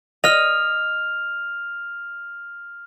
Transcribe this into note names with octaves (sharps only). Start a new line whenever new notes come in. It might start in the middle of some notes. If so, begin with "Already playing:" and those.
D#5 F6 F7